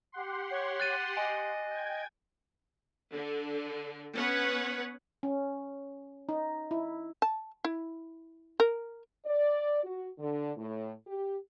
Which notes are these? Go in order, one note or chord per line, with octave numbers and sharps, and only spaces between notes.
G4 F#5 C6
C#5
F#6 A6 D#7
D#5 G#5
G5 G#6
D3
B3 C#4 B4 C#5 F#5
C#4
D#4
E4
A5
E4
A#4
D5
F#4
D3
A2
G4